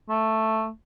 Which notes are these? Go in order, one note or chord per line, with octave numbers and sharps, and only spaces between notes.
A3